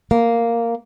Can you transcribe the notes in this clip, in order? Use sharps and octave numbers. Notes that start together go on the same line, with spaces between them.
A#3